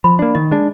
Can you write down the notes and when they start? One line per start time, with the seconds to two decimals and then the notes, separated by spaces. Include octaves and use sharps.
0.04 F3 B5
0.19 A#3 D4
0.35 D#3 D#5
0.51 G#3 D4